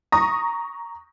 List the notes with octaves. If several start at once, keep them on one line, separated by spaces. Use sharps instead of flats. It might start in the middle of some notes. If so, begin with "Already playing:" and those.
A#5 C#6 D#6 A#6